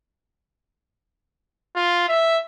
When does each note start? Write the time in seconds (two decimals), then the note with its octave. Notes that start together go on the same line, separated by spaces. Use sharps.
1.76 F4
2.08 E5